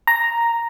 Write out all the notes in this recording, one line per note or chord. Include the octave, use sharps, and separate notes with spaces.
A#5